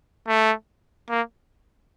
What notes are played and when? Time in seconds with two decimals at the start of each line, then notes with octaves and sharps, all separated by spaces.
0.27 A3
1.09 A#3